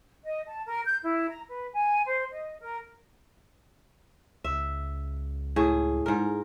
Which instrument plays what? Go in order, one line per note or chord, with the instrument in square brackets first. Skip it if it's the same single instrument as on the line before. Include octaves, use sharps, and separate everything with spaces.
[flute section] D#5
A5
A#4
G6
E4
A#5
B4
G#5
C5
D#5
A#4
[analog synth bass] C#2 [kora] E5
[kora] A2 G#4
G#2 A#4